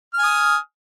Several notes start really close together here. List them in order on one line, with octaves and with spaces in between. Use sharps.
F6 G#5 D#6